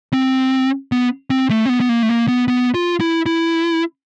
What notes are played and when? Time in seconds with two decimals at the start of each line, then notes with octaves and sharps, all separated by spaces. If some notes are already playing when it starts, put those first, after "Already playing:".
0.13 C4
0.92 B3
1.30 C4
1.50 A3
1.66 C4
1.69 B3
1.81 B3
1.89 A#3
2.03 A3
2.09 A#3
2.28 B3
2.48 B3
2.74 F4
3.01 E4
3.26 E4